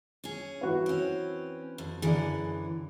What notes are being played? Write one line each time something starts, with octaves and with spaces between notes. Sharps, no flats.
C#4 G#4
E3 F#4 B4
C4 C#4
F2
F#2 D3 E3 G#4 D5